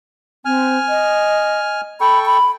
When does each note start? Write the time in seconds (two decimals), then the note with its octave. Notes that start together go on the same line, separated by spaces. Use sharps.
0.45 C4 G#5 F6
0.89 D#5
2.01 A4 G5 B5 C#6
2.26 B5